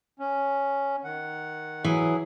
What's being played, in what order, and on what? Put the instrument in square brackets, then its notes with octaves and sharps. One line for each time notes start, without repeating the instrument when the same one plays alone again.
[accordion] C#4
D#3 F#5
[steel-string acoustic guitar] E3 [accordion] F#3 G#4